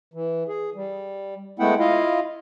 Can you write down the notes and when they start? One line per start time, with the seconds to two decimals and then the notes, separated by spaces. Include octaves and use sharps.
0.14 E3
0.48 G#4
0.75 G3
1.59 G#3 A3 B3 E4 F#5 G5
1.79 E4 F4 D#5 F5